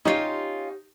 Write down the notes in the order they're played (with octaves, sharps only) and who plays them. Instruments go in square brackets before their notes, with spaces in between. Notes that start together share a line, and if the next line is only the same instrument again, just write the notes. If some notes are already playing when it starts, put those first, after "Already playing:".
[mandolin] C#4 F4 [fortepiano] D#4 [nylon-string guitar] G4 C#5